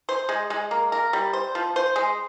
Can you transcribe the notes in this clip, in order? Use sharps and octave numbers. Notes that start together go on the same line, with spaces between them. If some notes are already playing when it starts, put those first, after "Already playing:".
C5
G#3
G#3
A#3
A#4
G3
C5
F3
C5
G#3